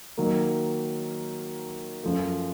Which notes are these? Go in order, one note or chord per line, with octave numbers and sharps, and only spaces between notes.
D#3 F#3 A#3
F#2 F3 A3